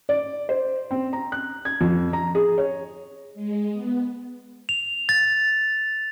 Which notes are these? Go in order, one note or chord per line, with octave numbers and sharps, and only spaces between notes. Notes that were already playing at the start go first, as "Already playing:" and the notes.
D5
C5
C4
A#5
F#6
G#6
F2
A#5
G#4
C#5
G#3
B3
F7
A6